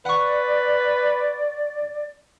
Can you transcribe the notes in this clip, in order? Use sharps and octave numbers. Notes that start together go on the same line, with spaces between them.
B4 D5 F#5 C#6